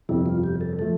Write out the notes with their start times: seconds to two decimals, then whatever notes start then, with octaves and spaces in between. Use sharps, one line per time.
0.09 G1 F2 C3 G3 E4
0.26 F4
0.44 G4
0.61 A4
0.79 F3 A3 A4